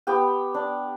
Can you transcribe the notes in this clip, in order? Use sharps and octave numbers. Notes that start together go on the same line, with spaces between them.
B3 G4 G5
D4